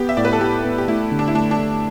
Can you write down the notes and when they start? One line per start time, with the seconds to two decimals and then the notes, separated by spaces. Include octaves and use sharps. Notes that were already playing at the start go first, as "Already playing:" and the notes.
Already playing: B3 G4
0.09 E5
0.17 A2 D5
0.25 B4
0.33 A4
0.40 A2 G4
0.65 B3
0.78 G4
0.88 A3 E4
1.12 D3
1.19 D4
1.28 E4
1.35 A3 D4
1.51 D4
1.59 D3